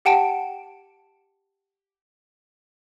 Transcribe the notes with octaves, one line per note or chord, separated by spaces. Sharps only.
G4 F#5 G5 A5 D7